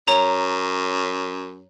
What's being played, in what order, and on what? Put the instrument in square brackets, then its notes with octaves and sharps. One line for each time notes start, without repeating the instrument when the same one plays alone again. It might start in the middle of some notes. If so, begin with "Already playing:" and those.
[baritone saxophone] F#2 [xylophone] C#5 A#5 F7